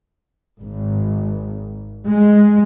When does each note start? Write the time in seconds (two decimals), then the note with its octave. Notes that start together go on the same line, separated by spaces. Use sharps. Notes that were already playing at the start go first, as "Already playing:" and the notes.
0.61 G#1
2.06 G#3